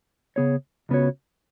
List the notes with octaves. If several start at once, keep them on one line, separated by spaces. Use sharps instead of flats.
C#3 B3 G#4 C#5
C#2 C#3 B3 F#4 C#5